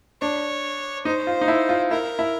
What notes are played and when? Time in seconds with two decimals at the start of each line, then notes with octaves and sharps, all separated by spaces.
0.21 D4 C#5
1.05 D#4 C5
1.27 F4
1.41 D#4
1.48 E4
1.69 F4
1.90 E4 A#4
2.19 E4